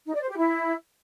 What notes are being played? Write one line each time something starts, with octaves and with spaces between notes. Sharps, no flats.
D#4
D5
C5
G4
E4